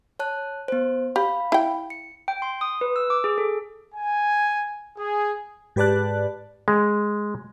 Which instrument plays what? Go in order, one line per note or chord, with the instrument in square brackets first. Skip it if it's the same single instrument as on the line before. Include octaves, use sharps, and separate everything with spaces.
[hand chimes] C#5 A5 F#6
B3 C5
[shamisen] G4 [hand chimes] F5 B5
[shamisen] E4 G5
[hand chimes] C#7
[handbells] G5
C6
D#6
B4
E6
D6
G#4
A4
[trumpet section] G#5
G#4
[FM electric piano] G#2 G4 B4 D5 A5 F#6
[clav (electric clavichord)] G#3